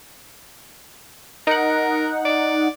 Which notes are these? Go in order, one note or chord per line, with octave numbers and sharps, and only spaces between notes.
D#4 A#4 F#5
D5